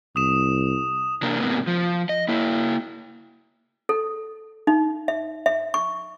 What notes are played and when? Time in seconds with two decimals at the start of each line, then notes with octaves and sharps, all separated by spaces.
0.16 C2 D#6 E7
1.22 C3 A#3 D4 A#4
1.40 G#2 C3 A#3 B3
1.67 F3
2.09 D#5
2.28 A#3 E4
3.89 A4
4.67 D#4
5.08 E5
5.46 E5
5.74 C#6